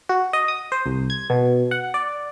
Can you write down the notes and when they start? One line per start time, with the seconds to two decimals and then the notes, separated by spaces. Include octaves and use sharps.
0.09 F#4
0.33 D#5
0.48 D#6
0.72 C5
0.86 C2
1.10 G#6
1.30 B2
1.71 F#5
1.94 D5